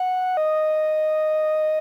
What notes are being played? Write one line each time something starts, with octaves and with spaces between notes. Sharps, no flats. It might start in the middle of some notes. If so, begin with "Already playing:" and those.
Already playing: F#5
D#5